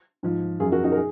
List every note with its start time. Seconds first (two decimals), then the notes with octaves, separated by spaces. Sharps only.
0.23 G#2 F3
0.60 F#2 F3 F4 G#4
0.72 F#4 A#4
0.84 D#4 F#4
0.92 A#4
0.96 G#4